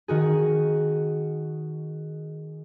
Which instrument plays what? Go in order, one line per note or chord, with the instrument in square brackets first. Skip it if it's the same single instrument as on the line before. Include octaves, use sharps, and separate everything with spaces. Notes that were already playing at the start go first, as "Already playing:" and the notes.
[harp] D#3 F#4 G#4